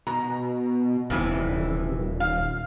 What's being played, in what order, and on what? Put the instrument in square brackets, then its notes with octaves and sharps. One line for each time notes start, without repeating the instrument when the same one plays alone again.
[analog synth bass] B2 [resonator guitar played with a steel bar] A#5
[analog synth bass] D#1 [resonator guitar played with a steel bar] F2 C3 E3
[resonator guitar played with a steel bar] F5